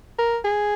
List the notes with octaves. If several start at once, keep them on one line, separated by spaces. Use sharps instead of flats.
A#4
G#4